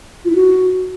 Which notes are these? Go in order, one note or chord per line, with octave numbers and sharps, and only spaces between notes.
F4
E4
F#4